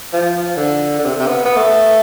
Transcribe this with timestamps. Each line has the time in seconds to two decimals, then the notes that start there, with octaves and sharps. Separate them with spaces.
0.13 F3
0.57 D3
0.99 D3
1.05 C3
1.20 C3
1.27 B3
1.45 B3
1.56 A3